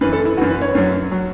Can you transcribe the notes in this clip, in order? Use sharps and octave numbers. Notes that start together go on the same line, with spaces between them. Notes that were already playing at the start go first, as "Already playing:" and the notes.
F#2 E3 B4
A4
E4
F#2 E3 F#4
B4
C#5
F#2 F#3
F#3